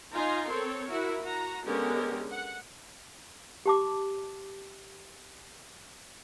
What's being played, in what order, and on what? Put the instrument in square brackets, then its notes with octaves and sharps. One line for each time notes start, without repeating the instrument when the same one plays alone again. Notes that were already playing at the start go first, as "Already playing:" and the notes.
[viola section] D#4 F4 G#5 A#5 C6
C4 A4 A#4 C#5
E4 F#4 A#4
F#4 A#5
D3 G#3 B3 C#4 G4 A#4
F#5
[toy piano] G4 A5 D6